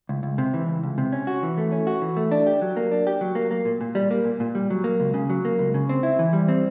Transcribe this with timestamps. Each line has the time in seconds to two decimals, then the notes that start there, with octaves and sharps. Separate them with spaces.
0.09 C#2
0.23 C#2
0.38 C3
0.54 E3
0.68 C#2
0.83 C#2
0.98 C3
1.12 C#4
1.27 F#4
1.43 E3
1.58 A3
1.72 C#4
1.87 F#4
2.02 E3
2.17 A3
2.32 D4
2.47 G4
2.61 F#3
2.77 A#3
2.91 D4
3.07 G4
3.21 F#3
3.35 A#3
3.51 A#3
3.65 A#2
3.81 A#2
3.95 G3
4.11 A#3
4.25 A#2
4.40 A#2
4.55 G3
4.70 F#3
4.84 A#3
5.00 C#2
5.14 C#3
5.30 F#3
5.45 A#3
5.59 C#2
5.74 C#3
5.89 C4
6.03 E4
6.19 E3
6.33 G3
6.48 C4